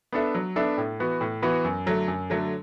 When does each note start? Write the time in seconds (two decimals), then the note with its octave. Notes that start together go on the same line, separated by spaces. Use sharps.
0.12 B3 D4 A4 E5
0.35 F#3
0.56 B3 D4 A4 E5
0.78 A2
1.00 E3 B3 F#4 B4
1.21 A2
1.42 E3 B3 F#4 B4
1.64 F#2
1.86 D3 F#3 A3
2.08 F#2
2.30 D3 F#3 A3